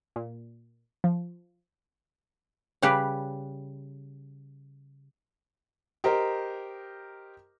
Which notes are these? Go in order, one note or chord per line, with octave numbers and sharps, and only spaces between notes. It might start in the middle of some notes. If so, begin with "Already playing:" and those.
A#2
F3
C#3 G3 G4 B4
G4 A#4 C5 D#5 A#5